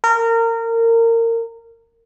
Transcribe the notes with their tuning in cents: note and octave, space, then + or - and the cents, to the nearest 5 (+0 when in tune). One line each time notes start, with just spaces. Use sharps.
A#4 -25